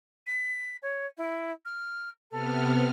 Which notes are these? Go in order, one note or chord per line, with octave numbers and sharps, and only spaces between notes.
B6
C#5
E4
F6
C3 B3 A4 F6